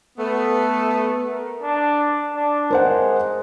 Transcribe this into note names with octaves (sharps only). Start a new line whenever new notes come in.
A3 B3
A#4
D4
D4
G#3 A#4 C5 F#5